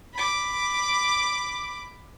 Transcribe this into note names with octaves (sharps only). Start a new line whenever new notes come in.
B5 D6